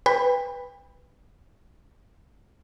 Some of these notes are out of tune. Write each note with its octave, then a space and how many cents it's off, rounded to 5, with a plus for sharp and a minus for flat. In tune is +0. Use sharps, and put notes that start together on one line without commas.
B4 +0 G5 +35